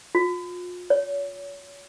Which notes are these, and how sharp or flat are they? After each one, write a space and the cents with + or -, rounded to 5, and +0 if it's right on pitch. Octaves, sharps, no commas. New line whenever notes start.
F4 +40
C#5 +35